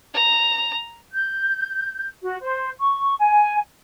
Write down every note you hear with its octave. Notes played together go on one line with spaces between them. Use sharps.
A#5
G6
F#4
C5
C#6
G#5